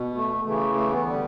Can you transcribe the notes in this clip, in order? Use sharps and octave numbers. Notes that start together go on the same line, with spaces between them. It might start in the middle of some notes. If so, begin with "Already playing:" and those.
Already playing: B2
A3
C#3 E3 A3
A3
B3
D3 G3